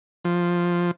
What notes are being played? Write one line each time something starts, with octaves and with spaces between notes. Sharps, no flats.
F3